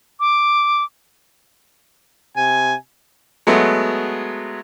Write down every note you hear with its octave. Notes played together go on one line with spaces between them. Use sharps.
D6
C3 G#5
F#3 G#3 A3 B3